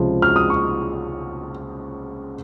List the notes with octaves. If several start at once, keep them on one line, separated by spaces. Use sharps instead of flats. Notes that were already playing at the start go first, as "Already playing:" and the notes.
Already playing: C#2 C3 F3 G#3
F6
D#6
C#6